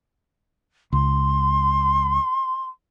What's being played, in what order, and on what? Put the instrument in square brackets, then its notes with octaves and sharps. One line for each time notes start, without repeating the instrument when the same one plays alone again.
[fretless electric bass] C#2 [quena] C6